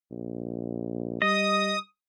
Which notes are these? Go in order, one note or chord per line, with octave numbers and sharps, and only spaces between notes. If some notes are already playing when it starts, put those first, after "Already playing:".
A#1
G3 D#5 D#6